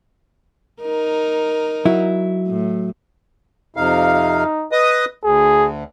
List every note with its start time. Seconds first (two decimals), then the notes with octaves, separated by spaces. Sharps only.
0.81 D#4 A#4
1.85 F#3 E4
2.47 A2
3.77 F2 C3 D#4 F5
4.72 B4 D#5 D#6
5.24 D2 G#4